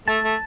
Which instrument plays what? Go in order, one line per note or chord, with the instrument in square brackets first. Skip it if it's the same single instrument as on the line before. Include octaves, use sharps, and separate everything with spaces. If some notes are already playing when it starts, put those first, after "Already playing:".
[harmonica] A3 [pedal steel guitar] A5
[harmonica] A3